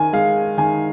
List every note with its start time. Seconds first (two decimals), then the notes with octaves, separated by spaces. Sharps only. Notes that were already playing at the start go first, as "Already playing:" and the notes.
Already playing: D#3 G#5
0.13 G#3 F5
0.58 D#3 G#5